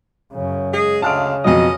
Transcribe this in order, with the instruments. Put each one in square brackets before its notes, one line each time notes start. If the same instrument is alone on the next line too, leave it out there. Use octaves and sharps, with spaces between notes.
[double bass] F#2 C#3
[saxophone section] G#3 G#4
[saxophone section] D2 G#3 F5 [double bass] C#3 [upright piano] A5 F6 D7
[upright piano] F2 B2 F#3 [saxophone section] C#4 D#5